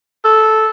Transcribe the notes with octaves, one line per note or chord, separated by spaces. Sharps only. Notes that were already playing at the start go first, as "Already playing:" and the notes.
A4